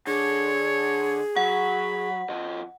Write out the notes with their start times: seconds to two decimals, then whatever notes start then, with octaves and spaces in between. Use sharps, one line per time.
0.07 D3 G#4 C#5
1.36 F#3 F#5 B5
2.30 F3 D#5